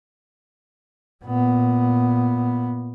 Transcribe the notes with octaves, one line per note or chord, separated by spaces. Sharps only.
A#2 B3